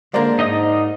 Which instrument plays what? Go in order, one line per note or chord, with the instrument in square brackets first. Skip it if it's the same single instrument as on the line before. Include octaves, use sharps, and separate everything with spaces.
[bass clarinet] D3 [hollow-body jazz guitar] G#3 A#3 D4 [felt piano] A#4 C5 D5
[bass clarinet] G#2 [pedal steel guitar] D#4 D#5 D#6